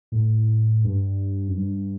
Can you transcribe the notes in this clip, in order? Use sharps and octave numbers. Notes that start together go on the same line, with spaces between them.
A2
G2
F#2
G2